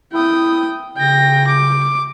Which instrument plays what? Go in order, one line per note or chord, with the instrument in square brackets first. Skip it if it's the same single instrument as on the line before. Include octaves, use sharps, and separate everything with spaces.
[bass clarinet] E4 [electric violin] G5 D#6
[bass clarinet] C#3 [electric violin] G5 A#6
[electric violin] D6